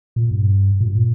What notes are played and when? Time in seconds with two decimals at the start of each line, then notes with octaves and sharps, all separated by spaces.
0.16 A#2
0.31 G2
0.80 A#2
0.86 G2
0.95 A#2